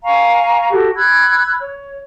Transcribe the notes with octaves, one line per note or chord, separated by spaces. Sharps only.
F5 G#5 A#5 C#6
F#4 G4 A4
B5 E6 F#6 G#6
C#5